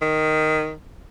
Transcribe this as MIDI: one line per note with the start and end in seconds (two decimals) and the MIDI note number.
0.02 0.74 51